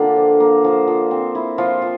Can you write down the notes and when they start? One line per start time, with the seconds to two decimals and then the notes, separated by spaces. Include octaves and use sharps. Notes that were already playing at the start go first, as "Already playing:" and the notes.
Already playing: D3 A#3 F4 G4 A4
0.16 F3
0.40 A#3
0.64 F3
0.88 F3
1.11 C4
1.35 E4
1.58 F3 F4
1.82 F3